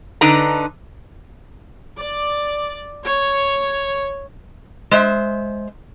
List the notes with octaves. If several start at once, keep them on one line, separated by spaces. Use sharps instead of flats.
D3 D4 D#4 B4 A#5
D5
C#5
G#3 C5 E5